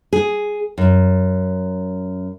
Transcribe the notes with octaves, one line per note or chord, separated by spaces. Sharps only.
G#4
F#2